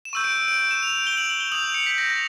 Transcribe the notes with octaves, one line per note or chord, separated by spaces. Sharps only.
E7
C#6 E6 G6 D#7
D7
D7
D7
D7
E7
F7
G7
F#7
F#7
G7
D#6 G6 F#7
F7
C#7
B6
A#6
A#6